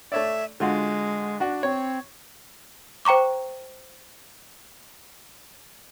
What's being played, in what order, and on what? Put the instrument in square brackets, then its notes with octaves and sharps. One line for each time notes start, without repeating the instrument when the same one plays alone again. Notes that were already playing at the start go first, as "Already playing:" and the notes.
[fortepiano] A3 C#5 D5 [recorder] E5
[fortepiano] D3 F4 F#4 [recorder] G#3
[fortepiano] D4 F#4
[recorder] C4 [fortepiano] C#5
[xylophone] C5 G5 A#5 C#6 D6